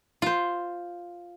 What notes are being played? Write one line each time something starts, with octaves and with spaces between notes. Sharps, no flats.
F4 C5